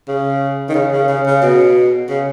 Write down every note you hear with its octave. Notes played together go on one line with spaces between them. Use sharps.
C#3
D#3
C#3
C#3
C#3
C#3
B2
C#3